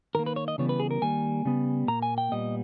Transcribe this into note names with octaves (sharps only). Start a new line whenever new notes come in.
D#3 A#3 A#4
B4
C#5
D#5
C#3 E3 G3 B3 C#5
B4
G#4
A#4
D#3 G3 A#3 G#5
C#3 G3 B3
A#2 A#3 A#5
G#5
G5
A#2 G3 B3 D#5